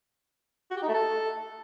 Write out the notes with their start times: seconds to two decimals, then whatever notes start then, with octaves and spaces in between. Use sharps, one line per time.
0.71 F#4
0.77 G4
0.82 D#4
0.88 A3
0.94 A4